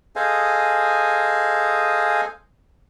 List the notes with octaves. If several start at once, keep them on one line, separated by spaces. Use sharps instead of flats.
G#4 A4 C5 D#5 F5 G#5